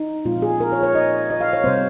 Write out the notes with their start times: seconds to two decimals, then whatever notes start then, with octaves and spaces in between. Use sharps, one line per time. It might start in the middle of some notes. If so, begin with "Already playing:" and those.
Already playing: D#4
0.25 A#2 F3 G#3 C4 F4
0.42 G#4
0.60 A#4
0.72 C#5
0.83 C#5
0.95 D#5
1.30 D#5
1.41 F5
1.53 C#5
1.64 C3 G3 C4 C5